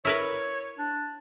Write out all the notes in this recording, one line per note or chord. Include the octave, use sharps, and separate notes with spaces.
E4 A#4 B4 C#5
D4